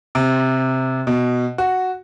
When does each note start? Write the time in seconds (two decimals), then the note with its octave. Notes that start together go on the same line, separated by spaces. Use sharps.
0.15 C3
1.07 B2
1.58 F#4